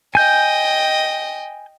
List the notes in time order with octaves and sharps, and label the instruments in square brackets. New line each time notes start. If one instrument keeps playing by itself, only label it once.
[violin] D#5 G5 [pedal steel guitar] G#5 G6